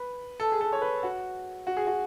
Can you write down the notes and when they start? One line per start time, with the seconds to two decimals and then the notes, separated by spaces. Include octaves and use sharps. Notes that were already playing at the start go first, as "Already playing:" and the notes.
Already playing: B4
0.40 A4
0.52 G#4
0.61 A4
0.73 C#5
0.82 B4
1.03 F#4
1.67 F#4
1.77 G#4
1.87 F#4